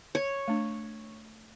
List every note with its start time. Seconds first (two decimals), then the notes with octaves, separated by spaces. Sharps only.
0.15 C#5
0.48 A3 D4